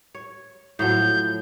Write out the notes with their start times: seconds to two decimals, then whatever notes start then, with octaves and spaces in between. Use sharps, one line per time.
0.15 C#5
0.79 A2 F3 F#3 G6